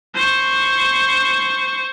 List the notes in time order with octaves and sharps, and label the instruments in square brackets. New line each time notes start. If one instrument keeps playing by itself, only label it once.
[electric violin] C5 C#6